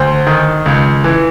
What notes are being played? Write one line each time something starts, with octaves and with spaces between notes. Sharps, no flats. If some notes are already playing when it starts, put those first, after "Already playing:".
Already playing: D2 C5
D#3
C#2
E3